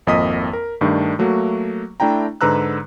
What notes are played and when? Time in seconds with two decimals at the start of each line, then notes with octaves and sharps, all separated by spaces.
0.07 G#1 F2 A#3 D#5 D#6 B6
0.53 A#4
0.81 G2 D#3 A3 D4
1.19 F#3 A3 A#3 F#4
2.00 A3 D4 E4 G5 A#5
2.41 G#2 D3 B4 A#5 E6 F#6